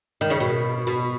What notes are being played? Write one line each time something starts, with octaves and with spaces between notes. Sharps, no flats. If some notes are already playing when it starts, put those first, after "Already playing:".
D#3
C#3
B2
B2